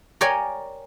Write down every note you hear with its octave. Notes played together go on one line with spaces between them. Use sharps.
A#4 C#5 D5 G5 G#5